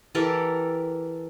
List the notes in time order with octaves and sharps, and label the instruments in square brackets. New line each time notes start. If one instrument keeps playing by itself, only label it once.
[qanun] E3 G4 A4 A#4